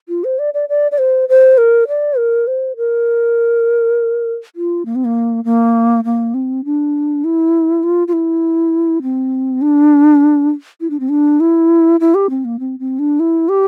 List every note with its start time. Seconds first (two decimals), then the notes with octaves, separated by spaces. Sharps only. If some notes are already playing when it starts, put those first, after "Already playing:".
0.09 F4
0.24 C5
0.39 D5
0.54 D5
0.69 D5
0.92 D5
0.98 C5
1.29 C5
1.58 A#4
1.88 D5
2.18 A#4
2.47 C5
2.77 A#4
4.56 F4
4.85 A#3
4.95 C4
5.05 A#3
5.45 A#3
6.05 A#3
6.34 C4
6.65 D4
7.24 E4
7.83 F4
8.08 F4
8.13 E4
9.02 C4
9.62 D4
10.80 E4
10.90 D4
11.00 C4
11.09 D4
11.40 E4
12.00 E4
12.15 G4
12.30 C4
12.45 A#3
12.60 C4
12.79 C4
12.99 D4
13.20 E4
13.49 G4